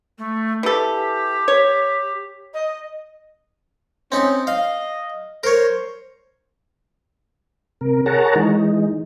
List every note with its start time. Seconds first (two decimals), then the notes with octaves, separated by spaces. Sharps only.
0.18 A3
0.63 E3 G4 A4
1.48 C#5
2.53 D#5
4.12 C4 C#4 D#4
4.47 D#5 F5
5.44 A#4 C5 C#5
7.81 C3 A#4
8.06 G#4 A#4 C#5 F#5 A5 A#5
8.36 E3 G#3 D#4